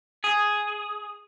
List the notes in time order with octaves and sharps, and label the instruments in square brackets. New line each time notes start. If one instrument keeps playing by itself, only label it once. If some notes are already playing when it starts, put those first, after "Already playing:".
[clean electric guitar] G#4